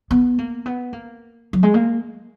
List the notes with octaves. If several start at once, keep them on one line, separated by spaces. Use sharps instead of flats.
B3
A#3
B3
A#3
F#3
G#3
A#3